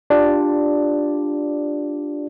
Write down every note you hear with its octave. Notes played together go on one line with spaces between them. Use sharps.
D4 F4 G4 D5